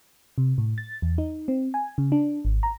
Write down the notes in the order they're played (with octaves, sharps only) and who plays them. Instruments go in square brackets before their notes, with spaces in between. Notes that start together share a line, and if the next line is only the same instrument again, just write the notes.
[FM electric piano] C3
A2
A6
E2
D#4
C4
G#5
C#3
D4
G#1
A#5